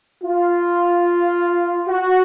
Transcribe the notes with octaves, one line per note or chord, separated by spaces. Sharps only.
F4
F#4